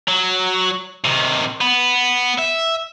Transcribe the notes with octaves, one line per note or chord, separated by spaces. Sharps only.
F#3
C3 D#3
B3
E5